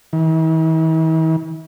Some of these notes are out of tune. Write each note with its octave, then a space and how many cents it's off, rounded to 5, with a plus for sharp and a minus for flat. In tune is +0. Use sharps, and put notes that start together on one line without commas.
E3 -45